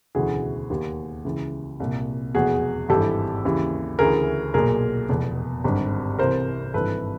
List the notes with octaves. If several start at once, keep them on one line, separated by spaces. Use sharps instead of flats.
E1 D2 C#3 E3 F#4 G#4
D#2 D#3
C#2 C#3 E3
C2 A#2
F1 E2 B2 F#4 G#4
G#1 G2 E3 G4 A4
D#2 C#3 E3
D2 C#3 E3 G#4 A#4
B1 A#2 G#4 A#4
F1 E2 B2
G#1 G2 D3
C2 C3 E3 A#4 C5
G#1 G2 E3 A4 B4